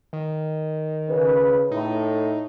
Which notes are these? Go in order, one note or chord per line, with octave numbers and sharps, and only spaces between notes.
D#3
C#3 B4
A2 D#4